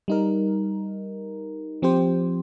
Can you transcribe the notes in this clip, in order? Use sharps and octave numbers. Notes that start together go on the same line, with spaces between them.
G3 D#4 A#4
F3 C4 G4 C5